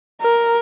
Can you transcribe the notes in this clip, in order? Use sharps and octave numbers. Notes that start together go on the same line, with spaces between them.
A#4